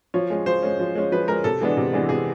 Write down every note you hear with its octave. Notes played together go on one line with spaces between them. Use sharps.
F3 C#5
G#3 C#4
F3 C5
G#3 C#4
F3
G#3 C#4
F3 B4
G#3 C#4 A#4
C3 A4
E3 G#3 B3 D4
C3
E3 G#3 B3 D4
C3 G#4